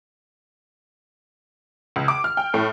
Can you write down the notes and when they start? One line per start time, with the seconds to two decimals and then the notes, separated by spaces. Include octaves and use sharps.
1.96 C#2
2.08 D6
2.24 F6
2.37 G5
2.54 A2